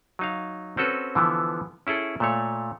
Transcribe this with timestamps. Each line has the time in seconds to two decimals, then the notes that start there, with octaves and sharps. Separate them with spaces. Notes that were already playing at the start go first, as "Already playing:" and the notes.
0.19 F#3 D#4 F5
0.77 C4 C#4 F#4 A4 B4
1.15 D3 E3 F3 B3
1.87 C#4 E4 G#4 A4
2.20 A#2 A3 C#5